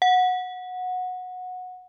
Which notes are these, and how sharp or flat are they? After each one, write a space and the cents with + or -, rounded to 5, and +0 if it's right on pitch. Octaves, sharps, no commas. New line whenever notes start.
F#5 -15